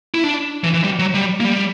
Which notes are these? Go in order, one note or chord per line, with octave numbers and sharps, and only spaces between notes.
E4
D4
E3
E3
G3
F#3
G3
A#3
G3